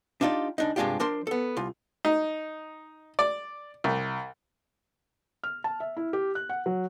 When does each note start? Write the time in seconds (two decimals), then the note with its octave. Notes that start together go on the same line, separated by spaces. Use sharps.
0.21 D4 D#4 F4 G4 D5
0.58 C#2 D4 D#4
0.76 G2 C3 G#3 D4 F4 G4
1.00 F3 D4 A#4 C5 C6
1.27 B3 A4
1.57 C2 F4
2.05 D#4
3.19 D5
3.84 C2
5.44 F6
5.64 A5
5.80 E5
5.97 E4
6.13 G4
6.35 F#6
6.49 F#5
6.66 F#3